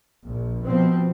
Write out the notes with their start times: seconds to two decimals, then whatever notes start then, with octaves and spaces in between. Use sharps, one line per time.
0.25 A#1
0.65 B2 F3 C4